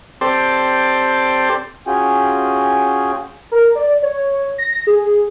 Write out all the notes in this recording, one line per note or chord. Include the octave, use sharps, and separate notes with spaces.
C4 G4 A4 C5 D5
C#4 F4 F#4 G#4 G5 G#5
A#4
D5
C#5
A#6
G#4